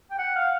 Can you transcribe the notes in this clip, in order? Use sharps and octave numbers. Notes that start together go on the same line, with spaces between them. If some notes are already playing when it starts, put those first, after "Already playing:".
G5
F#5
F5